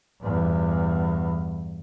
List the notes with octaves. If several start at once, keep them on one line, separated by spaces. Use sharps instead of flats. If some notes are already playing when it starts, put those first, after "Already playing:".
E2 G2